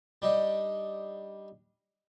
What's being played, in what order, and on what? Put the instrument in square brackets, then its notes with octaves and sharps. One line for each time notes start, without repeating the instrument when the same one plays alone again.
[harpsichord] G3 D4 D#4 D#5 G5